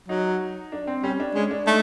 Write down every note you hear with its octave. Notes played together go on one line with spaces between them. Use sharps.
F#3 D#4
D4
C4
G3 C#4
D4
G#3 C#4
D4
A3 D#4